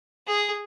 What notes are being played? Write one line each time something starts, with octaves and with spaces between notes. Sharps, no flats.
G#4